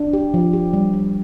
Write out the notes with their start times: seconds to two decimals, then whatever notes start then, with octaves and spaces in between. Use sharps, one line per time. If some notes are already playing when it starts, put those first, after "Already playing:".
Already playing: D4
0.13 G4
0.34 F3
0.53 G4
0.73 G3
0.93 G3